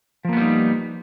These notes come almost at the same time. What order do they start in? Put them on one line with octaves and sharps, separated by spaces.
F3 A#3 B3 G3 D#4